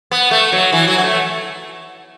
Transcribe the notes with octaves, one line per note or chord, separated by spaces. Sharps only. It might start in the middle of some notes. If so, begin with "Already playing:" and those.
B3
A3
F#3
E3
F#3
F#3
A3